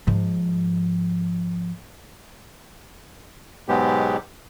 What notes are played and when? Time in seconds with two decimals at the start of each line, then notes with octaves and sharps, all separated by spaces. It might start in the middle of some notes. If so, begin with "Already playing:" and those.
0.07 G#2 F3
3.68 G#2 B2 F#3 G#3 B3 G4